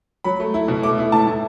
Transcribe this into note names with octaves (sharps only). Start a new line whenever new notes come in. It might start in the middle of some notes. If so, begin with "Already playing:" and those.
F#3 B5
A3
E4
B2
A3 D6
E4
A2 A5
A2